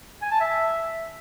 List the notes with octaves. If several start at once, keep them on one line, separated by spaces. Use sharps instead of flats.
G#5
A5
E5